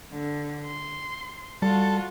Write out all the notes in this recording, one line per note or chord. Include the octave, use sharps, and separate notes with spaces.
D3
C6
G3 F4 F#4 A4